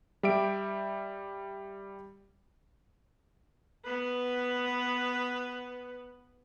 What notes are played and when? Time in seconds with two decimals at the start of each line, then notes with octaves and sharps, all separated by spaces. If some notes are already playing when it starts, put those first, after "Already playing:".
0.23 G3 G4 E5 D7
3.85 B3 B4